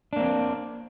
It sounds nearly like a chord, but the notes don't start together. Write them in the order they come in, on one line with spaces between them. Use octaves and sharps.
D4 A#3 C4